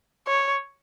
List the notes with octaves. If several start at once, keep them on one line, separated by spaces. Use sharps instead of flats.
C#5